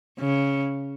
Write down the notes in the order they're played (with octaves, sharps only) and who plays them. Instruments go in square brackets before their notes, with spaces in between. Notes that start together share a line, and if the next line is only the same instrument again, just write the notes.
[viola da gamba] C#3